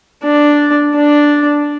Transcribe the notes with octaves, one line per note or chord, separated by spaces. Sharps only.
D4
D4